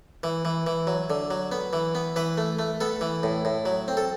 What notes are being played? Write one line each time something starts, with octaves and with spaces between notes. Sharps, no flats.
E3
E3
E3
F#3
D3
F#3
B3
E3
B3
E3 B4
A3
A3
B3 A4
E3
A2
A2
F#3
C4
A4